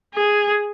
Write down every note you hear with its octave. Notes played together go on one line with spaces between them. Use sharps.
G#4